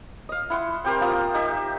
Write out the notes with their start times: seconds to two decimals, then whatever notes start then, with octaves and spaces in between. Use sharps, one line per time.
0.29 D#5 F5
0.50 E4 F#5 C6
0.84 C4 G4 A#4 C5
1.01 A#3 F4 D#6
1.34 D#4 G4 E5